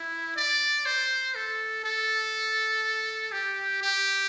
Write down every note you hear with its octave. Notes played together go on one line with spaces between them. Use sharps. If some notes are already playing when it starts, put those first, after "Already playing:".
Already playing: E4
D5
C5
A4
A4
G4
G4